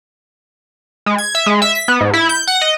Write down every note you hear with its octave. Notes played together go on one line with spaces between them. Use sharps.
G#3
G#6
E5
G#3
E5
B6
B3
G#2
E4
G6
F#5
D#5